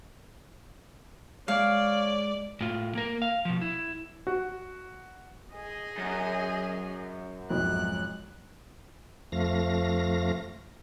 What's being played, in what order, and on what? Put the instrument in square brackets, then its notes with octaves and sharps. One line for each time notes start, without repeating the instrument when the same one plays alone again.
[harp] G#3 [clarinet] C#5 [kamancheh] D5 [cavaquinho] F5
[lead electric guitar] A2 F4
A#3 A#4
F5
B2 F3
E4
[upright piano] F#4
[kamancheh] G#4 D#5
[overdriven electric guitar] F#2
[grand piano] B1 F2 G#2 [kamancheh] F#6
[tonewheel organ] F2 F3 A3 F5 A#6